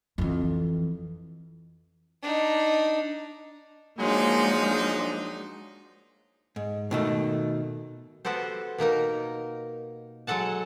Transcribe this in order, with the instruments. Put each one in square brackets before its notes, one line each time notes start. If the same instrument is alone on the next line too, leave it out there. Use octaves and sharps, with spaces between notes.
[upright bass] F2 E3
[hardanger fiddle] D4 D#4
[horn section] F3 F#3 D#4 [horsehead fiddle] G#3 [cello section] A#3 D4
[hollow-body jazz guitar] G#2
B2 D#3 A3
[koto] B3 F#4 G4 A4 C5
B2 A#3 D#4 A#4
F#3 G#3 A4 F#5 A5